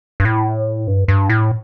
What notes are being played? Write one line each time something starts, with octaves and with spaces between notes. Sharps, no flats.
G2
A2
G2
G2
A2